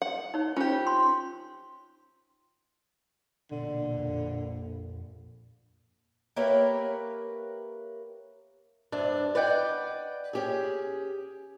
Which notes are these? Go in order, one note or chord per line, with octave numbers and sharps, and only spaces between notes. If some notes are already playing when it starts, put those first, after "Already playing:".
F#5
D#4 C#5
C#4 F4 G4 C5
C6
A#1 B2 D3
F2
A#3 G4 A#4 B4 C#5 E5
G2 C3 D4
B4 D5 D#5 F#5 G5
C#4 G4 G#4